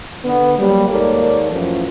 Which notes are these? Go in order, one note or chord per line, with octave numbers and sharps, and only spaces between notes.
D3 B3
F#3 G3 A#3
D#2 G#2 A#3 A4 C#5 D5
F#2 A2 E3 F3